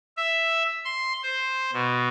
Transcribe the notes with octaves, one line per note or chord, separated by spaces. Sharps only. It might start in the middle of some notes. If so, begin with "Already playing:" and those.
E5
C6
C5
B2